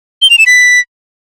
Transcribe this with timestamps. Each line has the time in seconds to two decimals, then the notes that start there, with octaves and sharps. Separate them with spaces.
0.22 G7
0.30 F7
0.38 E7
0.47 B6